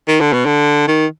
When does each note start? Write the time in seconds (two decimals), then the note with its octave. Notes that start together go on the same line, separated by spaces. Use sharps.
0.08 D#3
0.21 D3
0.33 B2
0.46 D3
0.88 D#3